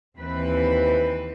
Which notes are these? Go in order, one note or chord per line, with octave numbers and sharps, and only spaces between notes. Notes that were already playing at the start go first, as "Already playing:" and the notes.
D#2 E3 C4 B4